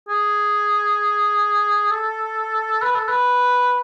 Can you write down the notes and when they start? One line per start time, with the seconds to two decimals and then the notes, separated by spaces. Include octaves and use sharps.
0.08 G#4
1.91 A4
2.82 B4
2.95 A4
3.08 B4